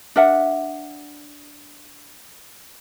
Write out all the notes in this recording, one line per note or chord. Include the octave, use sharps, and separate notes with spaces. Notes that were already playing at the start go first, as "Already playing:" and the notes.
D4 A#4 E5 F#5